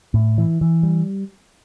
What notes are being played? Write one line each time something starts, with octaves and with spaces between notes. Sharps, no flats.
A2
E3
E3
G3